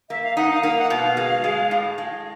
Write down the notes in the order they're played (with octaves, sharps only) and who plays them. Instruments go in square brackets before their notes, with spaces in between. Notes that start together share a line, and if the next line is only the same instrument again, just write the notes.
[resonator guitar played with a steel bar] A#3 [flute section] E5
[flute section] F5
[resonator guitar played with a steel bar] D#4 [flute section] F#5
[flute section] F5
[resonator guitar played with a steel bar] A#3 [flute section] F5
[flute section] F#5
[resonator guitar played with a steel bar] B2 [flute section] F5
[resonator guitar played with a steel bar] G#3
G#3
A2
G#3